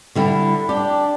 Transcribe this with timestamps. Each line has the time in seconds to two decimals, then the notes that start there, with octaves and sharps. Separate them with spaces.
0.15 D3 G3 E4
0.69 D4 G4